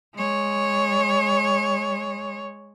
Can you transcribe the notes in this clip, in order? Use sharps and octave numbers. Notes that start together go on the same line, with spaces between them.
G#3 C#5